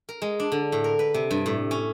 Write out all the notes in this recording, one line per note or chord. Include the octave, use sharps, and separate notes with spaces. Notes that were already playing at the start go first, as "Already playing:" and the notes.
A#4
G#3
D4
D3
A2
A#4
B4
C3
G2
A2
C#4